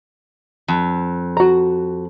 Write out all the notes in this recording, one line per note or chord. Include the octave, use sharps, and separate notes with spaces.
F2
F#4 A#5